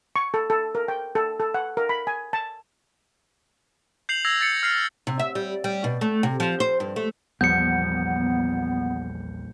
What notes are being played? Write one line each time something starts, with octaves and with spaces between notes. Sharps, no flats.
C#6
A4
A4
A#4
G5
A4
A4
F#5
A#4
B5
G#5
A5
G6 C7 F7 F#7
E6 G#6 A#6 C7 F7
A6 C7 C#7
F6 C7 F7
C3
E5
G3
G3
B2
A3
C3
F3
C5
G2
A3
A#1 E2 F3 G3 B3 G6 C#7